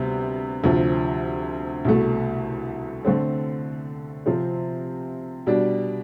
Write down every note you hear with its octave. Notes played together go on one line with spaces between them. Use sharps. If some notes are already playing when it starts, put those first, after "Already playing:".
Already playing: D2 C3 G3 B3
D2 C3 F3
C2 B2 A3
D3 A3 C4
C3 F3 C4
B2 G3 D4